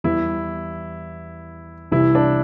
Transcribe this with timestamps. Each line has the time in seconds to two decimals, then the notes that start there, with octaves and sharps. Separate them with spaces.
0.04 E2 E3 G3 E4
1.91 C2 C3 E3 G3 E4
2.15 D4